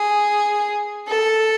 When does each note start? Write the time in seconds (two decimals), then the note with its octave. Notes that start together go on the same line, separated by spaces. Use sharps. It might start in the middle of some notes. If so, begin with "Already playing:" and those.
Already playing: G#4
1.08 A4